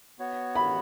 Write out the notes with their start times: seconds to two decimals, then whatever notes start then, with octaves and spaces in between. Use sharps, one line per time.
0.19 B3 F#4 C#5
0.55 B5